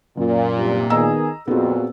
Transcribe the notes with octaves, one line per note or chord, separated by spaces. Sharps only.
F#2 A#2
G2 C3
D#3 B3 G#4 D#5 A#5 E6
F2 A#2 B3 C4 F#4 G#4